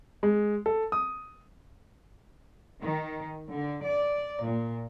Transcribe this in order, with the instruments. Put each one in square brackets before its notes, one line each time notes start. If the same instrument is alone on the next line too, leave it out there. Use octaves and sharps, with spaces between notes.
[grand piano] G#3
A4
D#6
[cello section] D#3
D3
D5
A#2